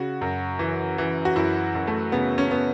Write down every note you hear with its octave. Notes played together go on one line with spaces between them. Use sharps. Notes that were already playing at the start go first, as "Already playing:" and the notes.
Already playing: C#3 F#4
F#2
E3
E3
F#4
F#2 E4
F#2
A3
C#3 B3
C#4
B3